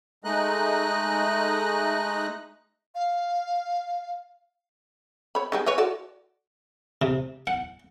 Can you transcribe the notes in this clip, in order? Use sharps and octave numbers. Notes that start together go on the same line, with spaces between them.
G#3 A3 D#4 D#5 F#6
F5
C#5 B5
D#3 G3 G#3
E3 B4 C#5
F#4 A4 D5
C3
F#5